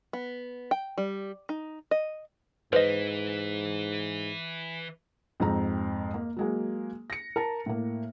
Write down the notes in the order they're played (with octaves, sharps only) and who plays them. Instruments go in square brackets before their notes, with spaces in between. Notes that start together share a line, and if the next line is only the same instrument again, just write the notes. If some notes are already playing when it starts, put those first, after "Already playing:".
[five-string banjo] B3
G5
G3
D#4
D#5
[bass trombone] G#2 [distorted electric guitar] E3 [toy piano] B4 [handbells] C5 D#5
[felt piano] F2 G#2 C4 A#5
A#3
F#3 G#3 A#3
A#6 C#7
A#4 A5
A2 A#3